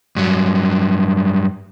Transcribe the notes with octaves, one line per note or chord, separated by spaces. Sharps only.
G2 F#3